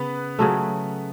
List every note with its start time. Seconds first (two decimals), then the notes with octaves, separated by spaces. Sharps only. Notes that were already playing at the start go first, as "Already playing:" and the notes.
Already playing: C#3 B3 B4
0.39 C#3 F#3 A3